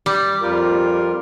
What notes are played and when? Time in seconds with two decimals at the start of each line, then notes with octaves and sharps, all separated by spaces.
0.06 G3
0.41 F2 F4 A#4